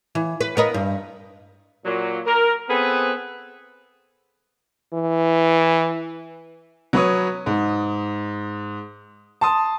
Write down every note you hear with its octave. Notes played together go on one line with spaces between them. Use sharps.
E3
B4
B3 A#4 D#5
G2
A#2 F#3
A#4
B3 C4 G#4 A4 B4
E3
F#3 B4 C#5 D#6
G#2
A5 C6 D#6